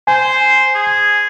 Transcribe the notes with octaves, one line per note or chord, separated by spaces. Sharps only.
C5 G#5
G#4